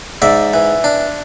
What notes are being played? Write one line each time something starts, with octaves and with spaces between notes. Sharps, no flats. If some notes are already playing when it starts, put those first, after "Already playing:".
G#2 D5 E5
E3
D4